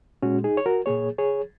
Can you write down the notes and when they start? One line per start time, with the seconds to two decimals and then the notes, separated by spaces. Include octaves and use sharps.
0.22 A#2 G#3 C#4 F#4
0.44 D#4 G#4
0.57 C#5
0.66 F#4 A#4
0.86 A#2 A#3 G#4 C#5
1.18 G#4 C#5